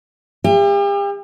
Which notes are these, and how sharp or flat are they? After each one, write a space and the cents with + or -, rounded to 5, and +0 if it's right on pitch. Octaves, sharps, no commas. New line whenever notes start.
G4 +40 E5 +40